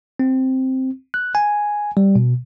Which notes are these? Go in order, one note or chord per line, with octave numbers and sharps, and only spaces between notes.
C4
F#6
G#5
G3
B2